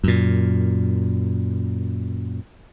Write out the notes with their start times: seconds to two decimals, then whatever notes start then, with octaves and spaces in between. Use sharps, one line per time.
0.04 F#2 A#2